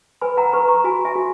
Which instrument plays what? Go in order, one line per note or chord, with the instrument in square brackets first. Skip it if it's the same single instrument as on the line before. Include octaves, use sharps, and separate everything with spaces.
[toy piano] B4 G#5 B5
F#5 A#5
B4 A#5 C#6
A#5 C#6
F#4 G#5 B5
E5 G#5
F#4